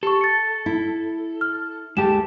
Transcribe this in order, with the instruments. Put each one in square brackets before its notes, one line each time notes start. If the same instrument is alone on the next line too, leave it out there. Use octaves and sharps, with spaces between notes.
[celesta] G4 C#6 [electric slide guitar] A4
[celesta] A6 C#7
[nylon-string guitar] E4
[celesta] F6
[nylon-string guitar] D2 G4 [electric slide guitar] G#3 A5 [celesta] E7